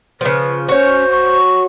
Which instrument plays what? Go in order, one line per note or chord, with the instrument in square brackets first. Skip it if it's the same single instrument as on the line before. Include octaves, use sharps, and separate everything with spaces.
[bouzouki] C#3 F3 [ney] B4
[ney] C#4 [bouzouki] F#4 C#5 [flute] C5
[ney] C#6